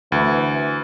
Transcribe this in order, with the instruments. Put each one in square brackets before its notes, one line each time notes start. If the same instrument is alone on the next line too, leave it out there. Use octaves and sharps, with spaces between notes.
[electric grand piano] D2 [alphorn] E3